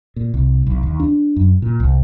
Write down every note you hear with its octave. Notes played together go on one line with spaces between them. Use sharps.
A#2
C2
B1
D#2
D4
F#2
A#2
C2